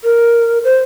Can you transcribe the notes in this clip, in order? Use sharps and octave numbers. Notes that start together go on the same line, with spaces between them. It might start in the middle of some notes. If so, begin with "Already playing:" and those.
A#4
C5